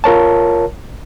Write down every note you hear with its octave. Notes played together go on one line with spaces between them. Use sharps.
F4 A#4 C#5 A5